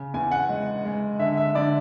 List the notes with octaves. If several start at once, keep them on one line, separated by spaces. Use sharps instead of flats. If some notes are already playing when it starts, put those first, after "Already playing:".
Already playing: C#3
E2 G#5
F#5
G#3
G#3
D3 E5
E5
D3 D5